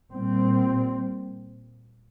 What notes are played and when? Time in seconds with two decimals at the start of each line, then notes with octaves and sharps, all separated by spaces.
0.12 A#2 G3 C4